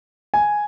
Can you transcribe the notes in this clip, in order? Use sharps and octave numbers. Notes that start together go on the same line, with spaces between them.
G#5